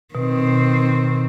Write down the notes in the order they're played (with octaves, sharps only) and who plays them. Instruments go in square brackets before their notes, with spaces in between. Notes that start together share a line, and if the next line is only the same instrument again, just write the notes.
[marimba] B2 [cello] D#3 C4